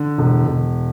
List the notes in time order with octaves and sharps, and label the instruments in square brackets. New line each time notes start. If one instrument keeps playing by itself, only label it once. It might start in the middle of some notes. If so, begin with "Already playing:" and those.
Already playing: [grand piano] D3
E1
E1